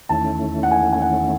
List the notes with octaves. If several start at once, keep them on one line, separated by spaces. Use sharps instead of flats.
E2 D#3 A3 C#4 E4 A5
F#5
G#5
G#5
F#5